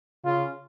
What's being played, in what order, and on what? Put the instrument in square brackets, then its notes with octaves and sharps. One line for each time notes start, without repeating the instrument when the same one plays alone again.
[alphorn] C#3 [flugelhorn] F4